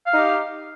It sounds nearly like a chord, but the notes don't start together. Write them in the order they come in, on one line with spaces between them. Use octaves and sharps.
F5 D#4 G4